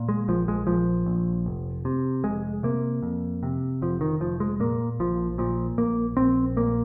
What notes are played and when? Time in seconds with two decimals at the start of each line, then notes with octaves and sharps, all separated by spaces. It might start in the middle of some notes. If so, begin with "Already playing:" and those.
Already playing: A#2
0.09 G#3
0.28 A#1 F3
0.48 G#3
0.67 A#1 F3
1.06 A#1
1.46 F1
1.85 C3
2.24 F1 G#3
2.63 C3 A#3
3.03 F2
3.43 C3
3.82 F1 F3
4.01 D#3
4.20 F1 F3
4.40 G#3
4.60 A#2 A#3
5.00 A#1 F3
5.38 A#2 F3
5.78 A#1 A#3
6.17 A#1 C4
6.57 A#2 A#3